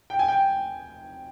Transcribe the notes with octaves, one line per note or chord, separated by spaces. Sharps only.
G5
G#5
G5